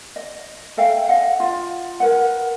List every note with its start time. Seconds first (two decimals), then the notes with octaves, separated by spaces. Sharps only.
0.16 D#5
0.77 A4 E5 F5 G5
1.09 D#5 F5 F#5
1.40 F4
2.00 A#4 B4 F#5